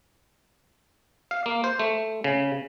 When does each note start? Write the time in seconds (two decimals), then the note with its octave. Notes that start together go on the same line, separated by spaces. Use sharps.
1.31 F5
1.46 A#3
1.64 C5
1.79 A3
2.24 C#3